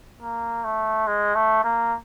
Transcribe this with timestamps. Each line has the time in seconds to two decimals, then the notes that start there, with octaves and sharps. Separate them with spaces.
0.22 A#3
0.64 A3
1.07 G#3
1.35 A3
1.64 A#3